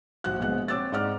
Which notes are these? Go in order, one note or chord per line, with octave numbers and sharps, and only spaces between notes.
A#1 F#4 F#5 F#6
A#1 G#3 B3 F#5 F#6
C4 C#5 D6 E6 F#6 A6
G#2 G#3 D5 F#5 D6 F6